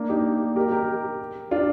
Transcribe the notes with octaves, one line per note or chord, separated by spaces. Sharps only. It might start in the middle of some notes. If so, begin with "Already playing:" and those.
Already playing: A#3 D4
D#4 G4
G4 A#4
G4 A#4
D4 F4